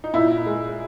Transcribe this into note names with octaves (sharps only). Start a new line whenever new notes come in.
D#4
A#2 E4
G#3